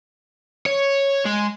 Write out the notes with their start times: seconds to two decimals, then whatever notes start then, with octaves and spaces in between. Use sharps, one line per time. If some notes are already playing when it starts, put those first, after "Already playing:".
0.66 C#5
1.26 G#3